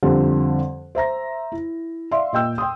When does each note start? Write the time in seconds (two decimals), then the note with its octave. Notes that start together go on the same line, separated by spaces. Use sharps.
0.03 F2 D3 G3 C4
0.95 C5 E5 A#5 A#6
1.52 E4
2.12 D5 E5 F5 C6
2.33 A#2 D#5 G5 E6 G6
2.58 G5 C6 D#6